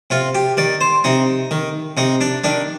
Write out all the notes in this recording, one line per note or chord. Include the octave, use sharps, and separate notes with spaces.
C3 F4
G4
D#3 D5
C5
C3 D#4
D#3
C3 D#4
D4
D#3 D4